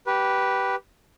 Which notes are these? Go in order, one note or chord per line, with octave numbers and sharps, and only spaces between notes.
G4 B4